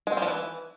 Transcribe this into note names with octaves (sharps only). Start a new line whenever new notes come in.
G#3
C4
G3
F3
E3